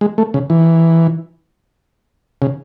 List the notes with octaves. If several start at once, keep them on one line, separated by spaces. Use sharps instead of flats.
G#3
A3
C#3
E3
C#3